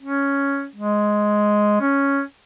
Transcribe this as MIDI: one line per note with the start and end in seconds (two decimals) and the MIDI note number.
0.01 0.66 61
0.75 1.77 56
1.81 2.21 61